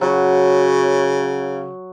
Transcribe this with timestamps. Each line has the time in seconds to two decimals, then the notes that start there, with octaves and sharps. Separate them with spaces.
0.01 C#3 F#3